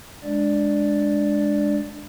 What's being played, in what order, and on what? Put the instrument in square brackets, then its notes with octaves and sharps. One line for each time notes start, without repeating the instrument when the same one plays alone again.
[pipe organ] G#3 D4 D5